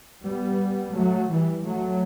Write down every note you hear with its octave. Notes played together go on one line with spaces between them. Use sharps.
G3 B3
F#3 A3
E3 G3
F#3 A3